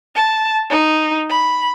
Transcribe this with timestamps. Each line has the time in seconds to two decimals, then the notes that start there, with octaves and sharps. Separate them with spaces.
0.15 A5
0.70 D#4
1.30 B5